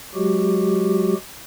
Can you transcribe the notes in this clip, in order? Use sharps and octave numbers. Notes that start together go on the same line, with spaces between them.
F#3 G#3 F#4 G4